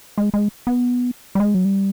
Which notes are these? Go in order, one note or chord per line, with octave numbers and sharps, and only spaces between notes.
G#3
G#3
B3
G3
G#3
F#3
G3